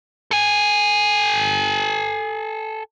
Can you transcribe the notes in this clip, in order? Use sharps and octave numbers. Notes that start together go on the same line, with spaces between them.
A4 G#5